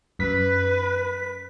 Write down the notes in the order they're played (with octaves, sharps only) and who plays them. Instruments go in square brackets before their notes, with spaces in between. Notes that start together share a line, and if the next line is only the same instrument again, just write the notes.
[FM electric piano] F#2 B6 [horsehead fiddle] B4